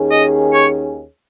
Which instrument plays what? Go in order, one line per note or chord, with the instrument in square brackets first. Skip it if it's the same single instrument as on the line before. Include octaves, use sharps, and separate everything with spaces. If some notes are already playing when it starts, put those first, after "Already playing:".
Already playing: [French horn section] D#2 D#3 C#4 G#4
[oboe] D#5
C#5